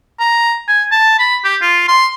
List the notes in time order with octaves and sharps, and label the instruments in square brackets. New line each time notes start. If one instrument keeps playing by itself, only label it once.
[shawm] A#5
G#5
A5
B5
G4
F4
C6